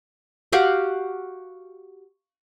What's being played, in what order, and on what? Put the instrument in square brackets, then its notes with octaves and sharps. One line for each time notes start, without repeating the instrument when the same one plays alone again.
[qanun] F#4 G4 F5 F#5